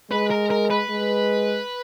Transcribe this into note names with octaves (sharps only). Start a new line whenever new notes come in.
G#3 B4
A#4
A#4
B4
G#3